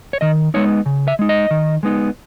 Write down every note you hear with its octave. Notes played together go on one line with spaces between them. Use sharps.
C#5
D#3 D#5
G#3 B3 D#4 C#5
C#3
E5
G#3 D#4
D#5
D#3
G#3 B3 D#4